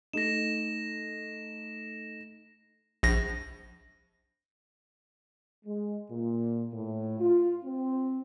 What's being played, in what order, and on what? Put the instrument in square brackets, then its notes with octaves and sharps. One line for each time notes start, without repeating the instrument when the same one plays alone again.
[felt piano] A3 D#4 [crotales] A#6 E7
[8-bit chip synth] A#1 A#6
[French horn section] G#3
A#2
A2
F4
C4